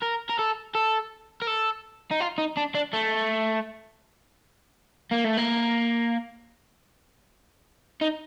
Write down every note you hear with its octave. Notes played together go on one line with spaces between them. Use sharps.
A#4
A#4
A4
A4
A#4
A4
D#4
F4
D#4
D4
D4
A3
A#3
A3
A#3
D#4